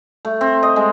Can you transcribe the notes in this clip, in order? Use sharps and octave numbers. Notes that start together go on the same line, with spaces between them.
A3
C4
D#5
G#3